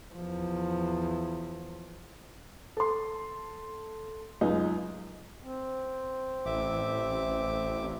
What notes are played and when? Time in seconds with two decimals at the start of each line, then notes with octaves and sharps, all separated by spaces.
0.14 E2 F3
2.77 A4 C6
4.41 C#2 F#2 D#4
5.42 C4
6.46 A1 E5 D6